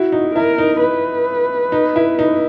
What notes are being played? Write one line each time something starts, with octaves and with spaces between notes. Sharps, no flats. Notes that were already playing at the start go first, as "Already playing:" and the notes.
Already playing: E4 F#4
D#4
E4 A#4
D#4
B4
D#4
E4
D#4